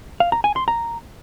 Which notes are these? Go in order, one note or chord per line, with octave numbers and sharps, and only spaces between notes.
F5
A#5
G#5
C6
A#5